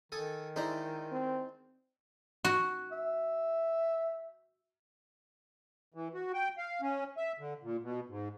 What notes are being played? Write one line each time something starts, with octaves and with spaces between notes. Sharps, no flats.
D#3 A4 G#5 D#6
G#3 D#4 E4 C5 D5 A#5
C4
F#4
E5
E3
F#4
G5
F5
C#4
E5
D3
A#2
B2
G#2